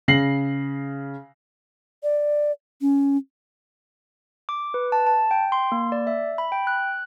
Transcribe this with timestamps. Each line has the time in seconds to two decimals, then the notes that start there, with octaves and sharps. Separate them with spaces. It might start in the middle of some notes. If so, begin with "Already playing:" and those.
0.08 C#3 A#6 C7 F#7
2.03 D5
2.81 C#4
4.49 D6
4.74 B4
4.92 A5
5.07 A5
5.31 G5
5.52 C6
5.72 A#3
5.92 D5
6.07 E5
6.38 B5
6.52 G5
6.67 F#6